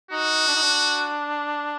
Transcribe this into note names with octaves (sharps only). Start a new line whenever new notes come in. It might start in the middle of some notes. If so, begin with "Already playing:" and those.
D#4 F#4
D4
D#4
D4